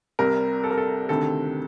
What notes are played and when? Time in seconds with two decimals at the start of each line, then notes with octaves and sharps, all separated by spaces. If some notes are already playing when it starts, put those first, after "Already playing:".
0.19 C2 C3 G3 A#4
0.64 A4
0.71 A#4
0.78 A4
1.09 D2 C3 D#3 A4